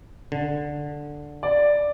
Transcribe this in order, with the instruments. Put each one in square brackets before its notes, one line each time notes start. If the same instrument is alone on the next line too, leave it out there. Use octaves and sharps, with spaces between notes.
[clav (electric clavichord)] D3
[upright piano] D5